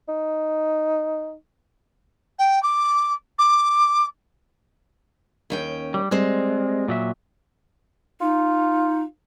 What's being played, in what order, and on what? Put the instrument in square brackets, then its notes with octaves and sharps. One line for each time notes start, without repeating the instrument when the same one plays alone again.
[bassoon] D#4
[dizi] G5
D6
D6
[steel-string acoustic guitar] D#2 C#4 G5
[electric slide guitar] G3
[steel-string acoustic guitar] G3 C4 [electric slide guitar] G#3
[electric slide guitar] A#2 F#3 E5
[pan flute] D#4 [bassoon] F4